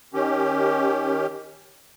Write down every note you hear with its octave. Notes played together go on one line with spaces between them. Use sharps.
D#3 C#4 G4